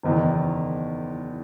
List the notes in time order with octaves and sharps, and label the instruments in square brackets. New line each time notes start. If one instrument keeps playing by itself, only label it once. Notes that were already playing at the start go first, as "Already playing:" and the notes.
[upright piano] F#1 E2 D#3